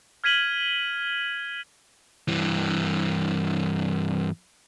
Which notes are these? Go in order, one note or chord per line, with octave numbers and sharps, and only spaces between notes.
F6 G#6 B6 D#7 F#7 G7
G2 E3